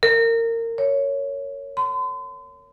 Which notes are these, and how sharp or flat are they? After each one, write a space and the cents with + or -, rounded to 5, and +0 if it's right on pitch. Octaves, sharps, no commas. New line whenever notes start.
A#4 -25
C#5 +5
C6 -40